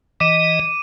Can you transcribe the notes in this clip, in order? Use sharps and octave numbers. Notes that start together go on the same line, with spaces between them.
E3 D#5 D6 D#7 E7